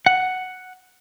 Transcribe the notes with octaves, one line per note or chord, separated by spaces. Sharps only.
F#5